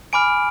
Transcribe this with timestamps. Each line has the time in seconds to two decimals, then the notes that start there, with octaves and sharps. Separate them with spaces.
0.13 G#5 B5 D6 F6 D7